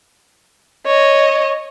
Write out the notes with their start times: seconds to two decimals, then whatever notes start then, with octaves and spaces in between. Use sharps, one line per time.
0.86 C#5 D#5